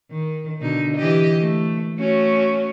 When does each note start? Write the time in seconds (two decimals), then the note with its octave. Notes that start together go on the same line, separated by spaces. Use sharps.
0.11 D#3
0.60 B2 D3 D#4
0.97 E3 G4 D#5
1.41 A3
1.98 A3 C#4 F#4